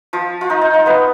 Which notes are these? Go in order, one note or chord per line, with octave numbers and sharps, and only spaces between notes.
F3 F4
F4
D#4
D#4
D#4
B3 B4